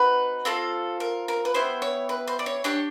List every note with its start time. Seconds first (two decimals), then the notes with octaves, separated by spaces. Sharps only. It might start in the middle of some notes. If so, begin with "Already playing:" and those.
Already playing: C4 D#4 F#4 B4
0.45 C4 F4 A4
1.00 A#4
1.28 A#4
1.45 B4
1.54 B3 E4 G4 C5
1.82 C#5
2.09 B4
2.28 C5
2.39 D5
2.46 C#5
2.64 D4 G4 C#5